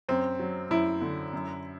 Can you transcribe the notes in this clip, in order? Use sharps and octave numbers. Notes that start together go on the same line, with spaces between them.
F#2 C4
F#3
F#2 E4
D3
F#2